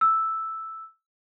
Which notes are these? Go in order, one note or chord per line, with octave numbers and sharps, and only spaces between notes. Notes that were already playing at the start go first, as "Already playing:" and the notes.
E6